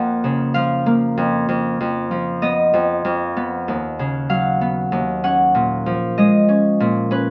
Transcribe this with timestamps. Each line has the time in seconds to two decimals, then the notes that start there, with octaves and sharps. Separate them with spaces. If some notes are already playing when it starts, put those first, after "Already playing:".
Already playing: F2 A#3 F#5
0.24 C#3
0.54 F3 F5
0.86 A#3
1.17 F2
1.48 F2
1.80 F2
2.11 F3
2.42 B3 D#5
2.73 F2
3.05 F2
3.37 B3
3.68 D#2
3.99 C#3
4.29 F#3 F5
4.61 B3
4.92 D#2
5.24 C#4 F#5
5.55 A#2
5.86 F3
6.18 G#3 D#5
6.49 C#4
6.80 A#2
7.11 C#4 B4